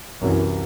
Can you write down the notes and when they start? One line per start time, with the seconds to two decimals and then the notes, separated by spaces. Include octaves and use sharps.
0.22 C2 F#2 C3 E3